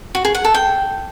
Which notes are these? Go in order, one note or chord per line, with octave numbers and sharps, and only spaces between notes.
F#4
G#4
F#5
A4
G5